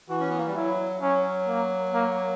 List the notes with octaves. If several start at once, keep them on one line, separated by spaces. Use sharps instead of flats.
E3 F#4
C#4
B3
A#3
G3
F#3 E4
F#3 C#4
A#3
A#3